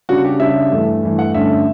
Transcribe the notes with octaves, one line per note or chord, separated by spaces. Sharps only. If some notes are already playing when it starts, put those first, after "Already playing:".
C#3 G3 D4 F#4
G4
C#3 G3 D4 E5
G2 E3 A3
G2 E3 A3
F#5
G2 D3 A3 C#4 E5